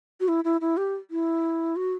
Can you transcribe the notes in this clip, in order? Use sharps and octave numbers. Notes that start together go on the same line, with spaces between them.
F#4
E4
E4
E4
G4
E4
F#4